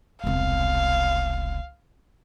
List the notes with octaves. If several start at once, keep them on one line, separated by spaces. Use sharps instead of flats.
E1 C2 F5